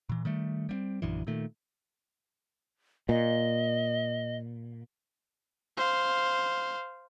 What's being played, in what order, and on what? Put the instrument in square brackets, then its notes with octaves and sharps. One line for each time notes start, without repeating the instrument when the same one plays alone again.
[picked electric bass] A#2 E3
D#3 G3 A3
G3 A#3 C4
A#1 F#2 D3 E3
A#2 D#3 A3
[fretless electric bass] A#2 [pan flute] D#5
[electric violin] C5 F5